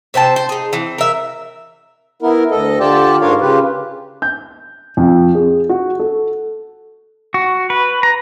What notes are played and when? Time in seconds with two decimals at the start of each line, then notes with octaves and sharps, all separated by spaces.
0.14 C3 C5 G5 A5
0.36 C5
0.49 D#4 G#4
0.73 E3 C4
0.98 A#4 E5
2.22 B3 E4 A#4
2.51 D2 A4 D#5
2.80 D3 F4 G4 D5 G5 A5
3.21 G#2 D4 F4 A#4 C#5 F5
3.41 C#3 F4 G4 B4
4.22 G6
4.97 F2
5.35 G#4
5.69 F#4
5.99 A4
7.34 F#4
7.70 B4
8.03 A#5